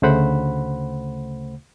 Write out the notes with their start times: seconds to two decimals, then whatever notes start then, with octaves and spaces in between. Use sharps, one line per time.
0.02 D2 C#3 A3 C5 F#5 B5